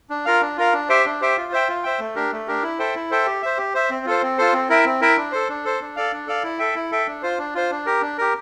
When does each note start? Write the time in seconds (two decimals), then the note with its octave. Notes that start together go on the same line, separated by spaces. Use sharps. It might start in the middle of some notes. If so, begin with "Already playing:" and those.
0.10 D4
0.25 F4 A#4 F5
0.41 D4
0.57 F4 A#4 F5
0.73 D4
0.89 G4 C5 E5 G5
1.05 D4
1.21 G4 C5 E5 G5
1.37 F4
1.52 C5 E5 G5
1.68 F4
1.83 C5 E5 G5
1.99 A3
2.15 D4 G4 A#4
2.32 A3
2.48 D4 G4 A#4
2.63 E4
2.79 A4 C5 E5 G5
2.95 E4
3.11 A4 C5 E5 G5
3.26 G4
3.42 C5 E5
3.58 G4
3.74 C5 E5
3.90 C4
4.06 F4 A4 C5
4.22 C4
4.38 F4 A4 C5
4.53 C4
4.69 E4 A#4 E5 G5
4.85 C4
5.01 E4 A#4 E5 G5
5.17 D4
5.32 A4 C5
5.49 D4
5.64 A4 C5
5.81 D4
5.96 A4 D5 F5
6.12 D4
6.27 A4 D5 F5
6.43 E4
6.59 A4 E5 G5
6.75 E4
6.91 A4 E5 G5
7.06 D4
7.23 F4 C5
7.38 D4
7.55 F4 C5
7.71 D4
7.86 G4 A#4
8.01 D4
8.18 G4 A#4